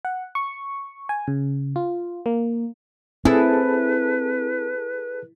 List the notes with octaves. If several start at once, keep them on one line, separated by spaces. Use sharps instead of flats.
F#5
C#6
G#5
C#3
F4
A#3
C4 E4 G#4 A4 B4 A5